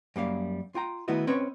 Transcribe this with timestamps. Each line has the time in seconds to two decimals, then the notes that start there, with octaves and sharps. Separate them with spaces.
0.16 F#2 G3 A#3 F5
0.75 F4 G5 A#5
1.08 D#3 A3 B3 E4 F#4 D#5
1.27 C4 C#4 B4 C#5 D#5